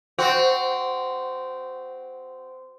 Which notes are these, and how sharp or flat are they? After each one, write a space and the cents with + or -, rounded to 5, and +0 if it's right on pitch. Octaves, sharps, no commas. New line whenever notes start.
C4 -15 F#4 +0